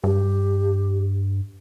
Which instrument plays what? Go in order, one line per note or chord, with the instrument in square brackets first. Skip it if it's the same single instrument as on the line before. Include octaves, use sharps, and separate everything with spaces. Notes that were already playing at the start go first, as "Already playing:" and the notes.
[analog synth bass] G2 [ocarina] G4